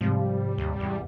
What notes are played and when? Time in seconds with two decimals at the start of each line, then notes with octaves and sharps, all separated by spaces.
0.01 G#2 C3 F3 G3
0.58 D#2
0.80 E2